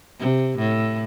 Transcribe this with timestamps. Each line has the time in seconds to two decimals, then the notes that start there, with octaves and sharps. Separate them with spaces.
0.19 C3
0.58 A2